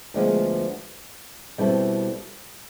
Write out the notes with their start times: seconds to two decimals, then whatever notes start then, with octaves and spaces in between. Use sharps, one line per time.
0.14 D2 D3 F3 G#3 B3
1.58 B2 G3 C4 E4 A4